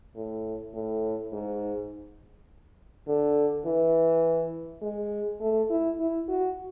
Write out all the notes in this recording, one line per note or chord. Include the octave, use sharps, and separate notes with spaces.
A2
A2
G#2
D3
E3
G#3
A3
E4
E4
F#4